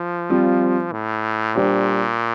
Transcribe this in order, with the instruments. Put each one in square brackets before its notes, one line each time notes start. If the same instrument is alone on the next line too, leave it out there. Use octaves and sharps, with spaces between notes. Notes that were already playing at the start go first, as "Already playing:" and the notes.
Already playing: [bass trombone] F3
[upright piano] G3 C4 F4
[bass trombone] A2
[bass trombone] A#2 [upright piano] G3 D4 G4 C5